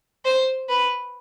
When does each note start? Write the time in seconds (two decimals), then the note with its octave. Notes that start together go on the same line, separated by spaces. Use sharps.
0.25 C5
0.69 B4